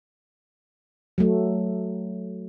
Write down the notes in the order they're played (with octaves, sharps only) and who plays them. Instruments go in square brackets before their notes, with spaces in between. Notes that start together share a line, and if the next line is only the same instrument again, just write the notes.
[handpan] F#3 A3